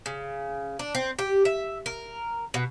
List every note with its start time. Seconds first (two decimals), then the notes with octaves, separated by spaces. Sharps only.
0.06 C#3
0.79 D4
0.95 C4
1.19 G4
1.45 E5
1.86 A#4
2.54 B2